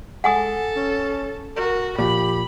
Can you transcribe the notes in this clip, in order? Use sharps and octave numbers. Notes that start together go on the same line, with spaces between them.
G#3 A4 F#5 G#5 D#6
C#4
F#4 A#4
A#2 F3 G4 B5